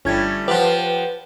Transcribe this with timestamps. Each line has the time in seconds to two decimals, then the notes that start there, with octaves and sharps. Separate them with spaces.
0.05 G1 G3 A3 C#4 G#6
0.48 F3 F4 G4 B4 F#5